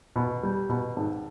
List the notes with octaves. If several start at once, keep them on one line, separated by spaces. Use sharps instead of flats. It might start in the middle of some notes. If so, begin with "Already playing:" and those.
B2
G3
B2
G#1